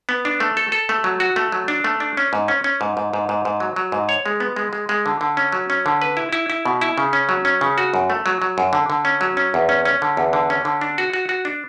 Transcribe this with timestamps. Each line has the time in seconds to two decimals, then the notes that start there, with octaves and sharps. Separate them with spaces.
0.09 B3
0.25 D4
0.40 A3
0.57 A4
0.72 A4
0.89 A3
1.04 F#3
1.20 F#4
1.36 A3
1.52 F#3
1.68 D4
1.84 A3
2.00 D4
2.17 C#4
2.33 G#2
2.48 C#4
2.64 C#4
2.81 G#2
2.97 G#2
3.13 G#2
3.29 G#2
3.45 G#2
3.60 F#3
3.76 F#3
3.92 G#2
4.09 C#5
4.26 G#3
4.40 B3
4.56 G#3
4.73 G#3
4.89 G#3
5.06 D3
5.21 D3
5.37 C#4
5.52 F#3
5.70 C#4
5.86 D3
6.02 B4
6.17 E4
6.33 E4
6.50 E4
6.65 B2
6.81 E4
6.98 C#3
7.13 C#4
7.29 F#3
7.45 C#4
7.61 C#3
7.78 F#4
7.94 F#2
8.10 A3
8.26 F#3
8.42 F#3
8.58 F#2
8.73 D3
8.90 D3
9.05 C#4
9.21 F#3
9.37 C#4
9.54 E2
9.69 C#4
9.85 C#4
10.02 D3
10.17 E2
10.33 D3
10.50 C#4
10.65 D3
10.81 D4
10.98 F#4
11.13 F#4
11.29 F#4
11.45 D4